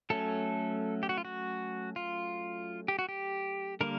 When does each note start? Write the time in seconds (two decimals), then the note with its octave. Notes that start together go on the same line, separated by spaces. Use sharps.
0.10 F#3 A3 C#4 A4
1.03 G4
1.09 F#4
1.18 F4
1.25 F#4
1.96 F4
2.88 G4
2.99 F#4
3.09 G4
3.81 D3 G3 A#3 A#4